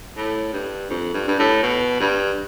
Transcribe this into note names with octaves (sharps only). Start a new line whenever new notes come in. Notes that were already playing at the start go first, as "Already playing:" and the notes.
A2
G2
F2
G2
G2
A2
B2
G2